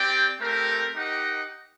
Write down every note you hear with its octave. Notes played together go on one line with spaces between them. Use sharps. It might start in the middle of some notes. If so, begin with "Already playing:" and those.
Already playing: C4 G4 D5 G5
A3 C4 G4 A#4
D#4 G4 A#4 D#5 F#5